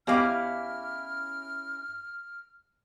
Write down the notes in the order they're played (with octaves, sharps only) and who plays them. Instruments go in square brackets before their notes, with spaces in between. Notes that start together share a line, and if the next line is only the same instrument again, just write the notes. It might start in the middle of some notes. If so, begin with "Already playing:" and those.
[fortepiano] E2 [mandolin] C#4 E4 D6 [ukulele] G4 D#5 F5 [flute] F6